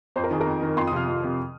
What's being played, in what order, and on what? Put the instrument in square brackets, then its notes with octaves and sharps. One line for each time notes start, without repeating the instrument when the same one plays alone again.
[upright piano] F2 C5
A#4
D#3 G#4
A#4
F2
D#3
F2 C6
D#6
C3 F3 F6
F2
C3 F3